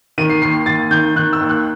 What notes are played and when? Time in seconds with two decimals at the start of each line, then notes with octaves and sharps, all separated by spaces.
0.18 D#3 D#7
0.30 C7
0.42 D#2 C7
0.66 D#2 A6
0.91 D#3 G6
1.16 D#3 F#6
1.33 E6
1.41 D#2
1.49 F#6